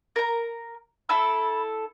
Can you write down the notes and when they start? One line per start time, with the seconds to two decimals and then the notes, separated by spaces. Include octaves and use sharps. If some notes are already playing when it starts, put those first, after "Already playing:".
0.16 A#4 A#5
1.09 E4 A4 B5 E6